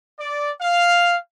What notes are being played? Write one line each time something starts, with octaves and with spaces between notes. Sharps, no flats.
D5
F5